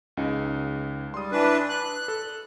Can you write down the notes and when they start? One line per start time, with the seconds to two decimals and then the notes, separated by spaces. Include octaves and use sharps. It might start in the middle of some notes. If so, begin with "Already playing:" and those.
0.17 C#2 C#3 D#4
1.14 G3 C6 D#6
1.32 E3 D4 B4
1.69 F#6
2.08 A4